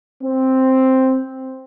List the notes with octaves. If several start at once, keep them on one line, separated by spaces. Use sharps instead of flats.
C4